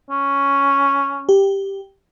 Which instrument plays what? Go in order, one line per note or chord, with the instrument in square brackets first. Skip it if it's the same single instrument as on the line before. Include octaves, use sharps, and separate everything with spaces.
[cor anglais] C#4
[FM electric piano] G4